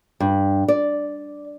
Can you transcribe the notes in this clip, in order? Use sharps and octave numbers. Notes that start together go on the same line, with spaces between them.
G2
D5